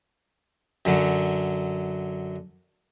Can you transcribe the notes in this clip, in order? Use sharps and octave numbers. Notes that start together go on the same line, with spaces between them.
F#2 D3 F#3